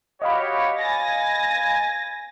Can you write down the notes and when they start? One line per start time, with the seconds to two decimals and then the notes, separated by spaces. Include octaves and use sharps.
0.22 F#4 G4 C#5 D#5 F5 B5
0.80 G#5 A6 A#6